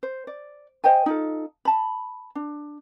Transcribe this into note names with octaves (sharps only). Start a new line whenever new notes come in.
C5
D5
C5 D#5 G5 G#5
D#4 F4 A4
A5 B5
D4